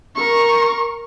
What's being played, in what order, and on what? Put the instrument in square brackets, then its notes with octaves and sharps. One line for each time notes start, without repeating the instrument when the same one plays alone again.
[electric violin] A#4 C#6